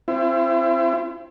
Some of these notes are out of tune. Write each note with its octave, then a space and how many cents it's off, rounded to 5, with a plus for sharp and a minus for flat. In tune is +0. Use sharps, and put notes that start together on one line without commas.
C4 +10 E4 +40